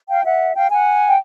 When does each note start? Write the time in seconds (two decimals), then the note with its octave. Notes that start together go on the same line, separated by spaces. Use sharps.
0.08 F5 G5
0.25 E5 F#5
0.55 F5 G5
0.71 F#5 G#5
1.08 G5